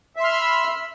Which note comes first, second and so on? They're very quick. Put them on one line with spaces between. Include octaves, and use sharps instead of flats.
E5 C6 F6 E6 B5